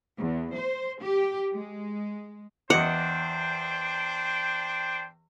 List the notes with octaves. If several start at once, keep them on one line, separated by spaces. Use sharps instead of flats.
E2
C5
G4
G#3
E2 D4 C5 D#5 F#5 G5 D6